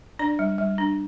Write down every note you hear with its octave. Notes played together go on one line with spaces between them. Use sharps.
D4 D5
G3
G3
D4